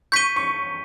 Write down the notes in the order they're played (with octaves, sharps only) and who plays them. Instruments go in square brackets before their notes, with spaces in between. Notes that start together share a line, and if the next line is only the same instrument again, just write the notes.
[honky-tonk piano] C#6 [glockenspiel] G6 B6 D#7 G7
[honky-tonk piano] C#6